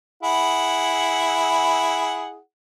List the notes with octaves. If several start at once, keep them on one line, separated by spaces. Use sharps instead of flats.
E4 G#4 F#5